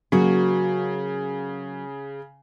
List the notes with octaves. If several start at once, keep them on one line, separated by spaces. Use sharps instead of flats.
C#3 F#3 A#3 F#4